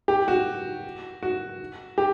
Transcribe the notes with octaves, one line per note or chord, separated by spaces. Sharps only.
G4
F#4
F#4
G4